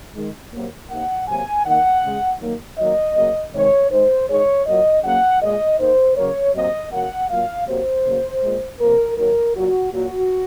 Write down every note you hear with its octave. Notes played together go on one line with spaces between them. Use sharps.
D#3 G#3
C3 F#3 A#3
C3 D#3 A#3 F#5
C3 F#3 A#3 G#5
D#3 A#3 F#5
C#3 G#3
D#3 F#3 A#3
D#3 F#3 A#3 D#5
C#3 F#3 A#3
C3 D#3 G#3 C#5
D#3 G#3 C5
D#3 G#3 C#5
A#2 F#3 A#3 D#5
C#3 F#3 A#3 F#5
A#2 G#3 D#5
D#3 A#3 C5
C#3 F#3 A#3 C#5
C3 F#3 A#3 D#5
C#3 F#3 A#3 F#5
A#2 F#3 A#3 F5
C3 F#3 A#3 C5
C#3 F#3 A#3
A#2 G#3
C3 F3 A#3 A#4
D#3 F#3 A#3 A#4
A#2 F#3 A#3 F#4
A#2 F#3 A#3 F#4